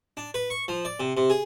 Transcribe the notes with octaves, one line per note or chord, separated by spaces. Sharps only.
D4
B4
C#6
F3
D5
C3
C3
G#4